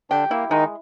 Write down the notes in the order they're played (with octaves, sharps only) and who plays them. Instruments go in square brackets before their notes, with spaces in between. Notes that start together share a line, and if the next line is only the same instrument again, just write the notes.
[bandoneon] D3 D4 [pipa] G4
[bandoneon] A#3 [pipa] E4
[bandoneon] D#3 D#4 [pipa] G#3